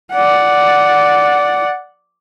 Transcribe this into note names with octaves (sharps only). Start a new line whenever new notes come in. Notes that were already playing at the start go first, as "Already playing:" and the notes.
D5 F#5